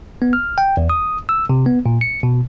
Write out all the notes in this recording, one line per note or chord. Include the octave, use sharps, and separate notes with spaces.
B3
F6
G5
E2
D#6
E6
C3
B3
A#2
C#7
B2